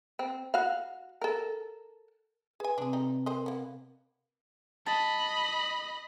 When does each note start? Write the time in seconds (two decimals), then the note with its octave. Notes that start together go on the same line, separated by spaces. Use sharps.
0.19 C4
0.54 F#4 F5
1.21 A4 A#4
2.60 G#4 B4 G#5
2.78 C3 C4 D4 G#4
2.93 G3 A3 D#4
3.26 C4 A#4 C5 D#5
3.46 A#3 B3
4.86 D#5 A5 B5